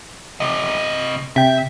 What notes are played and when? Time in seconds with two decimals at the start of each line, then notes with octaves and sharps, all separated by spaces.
0.40 C3 D#5
1.36 C3 E5 G5